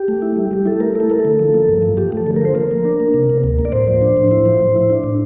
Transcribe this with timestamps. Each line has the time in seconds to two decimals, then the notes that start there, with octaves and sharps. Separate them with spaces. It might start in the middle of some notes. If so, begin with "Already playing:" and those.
Already playing: G4
0.08 A3
0.22 E4
0.36 G3
0.51 G3 G4
0.66 E4 A4
0.80 A3 A#4
0.95 E4 A4
1.10 A3 A#4
1.20 D3 A4
1.39 F3
1.54 A#3
1.69 G2
1.82 F3
1.97 F3 G4
2.12 A3 A4
2.26 D3
2.36 A#4
2.41 F3 C5
2.55 A#3 A#4
2.71 A#3
2.85 D4
3.00 A#3
3.14 C3
3.30 C3
3.44 D2
3.59 A#3
3.65 D5
3.72 A2 C5
3.87 F3
4.01 D4
4.17 A2
4.31 E4
4.46 F3
4.60 A2
4.76 E4
4.90 D4
5.04 A2